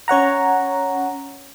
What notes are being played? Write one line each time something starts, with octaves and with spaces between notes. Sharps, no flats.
C#4 C#5 F#5 A#5